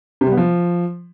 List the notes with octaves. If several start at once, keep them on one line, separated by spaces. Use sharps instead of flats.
C3
G3
B3
F3